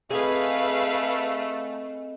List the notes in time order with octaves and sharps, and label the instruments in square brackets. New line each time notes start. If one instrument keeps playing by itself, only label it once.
[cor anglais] A3 [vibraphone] C4 A4 D#5 [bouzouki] G#4 [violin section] B4 F5